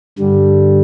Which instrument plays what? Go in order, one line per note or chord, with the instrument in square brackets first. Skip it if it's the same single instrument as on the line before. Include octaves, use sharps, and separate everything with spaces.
[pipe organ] G2 D3 G3